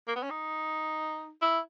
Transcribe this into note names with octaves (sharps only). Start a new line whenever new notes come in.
A#3
B3
C#4
D#4
E4